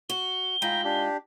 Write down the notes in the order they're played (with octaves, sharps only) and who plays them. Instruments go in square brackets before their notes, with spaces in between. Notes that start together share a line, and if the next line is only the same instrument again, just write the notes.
[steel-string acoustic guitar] F#4 [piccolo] G7
[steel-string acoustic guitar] G#2 G#3 F4 [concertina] G5 A#5 B5
[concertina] D4 G4